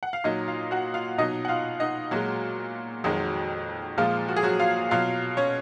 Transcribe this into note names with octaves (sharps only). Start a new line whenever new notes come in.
F#5
F5
A#2 F#3 D#4 D#5
F4 F5
F#4 F#5
F4 F5
B2 F#3 D#4 D#5
F#5
F4 F5
D#4 D#5
A#2 F#3 G#3 F#4
F2 D#3 F#3 G#3 F#4
A#2 F3 G#3 F4
F#4
G#4
F#3 F#4
F4 F5
B2 F#3 F4 F5
C#4 C#5